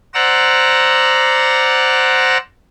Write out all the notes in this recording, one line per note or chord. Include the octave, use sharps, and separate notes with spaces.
C5 D5 F#5 A#5 E6